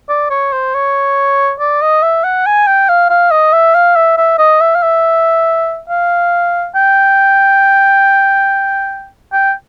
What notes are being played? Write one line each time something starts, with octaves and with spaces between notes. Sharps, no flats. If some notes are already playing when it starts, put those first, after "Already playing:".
D5
C#5
C5
C#5
D5
D#5
E5
F#5
G#5
G5
F5
F5
D#5
E5
F5
E5
E5
D#5
E5
F5
E5
F5
G5
G5